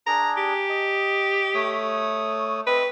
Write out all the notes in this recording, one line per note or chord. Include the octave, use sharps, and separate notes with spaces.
D4 G#4 A#5
G4
D#5
A3 C#5 D#6
C4 B4 D#5